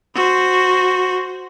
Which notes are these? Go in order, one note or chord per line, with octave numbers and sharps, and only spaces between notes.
F#4 C5